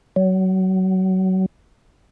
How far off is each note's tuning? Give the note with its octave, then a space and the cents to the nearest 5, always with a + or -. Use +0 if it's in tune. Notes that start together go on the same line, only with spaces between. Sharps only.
F#3 +25